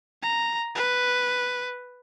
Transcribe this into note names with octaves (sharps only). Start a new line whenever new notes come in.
A#5
B4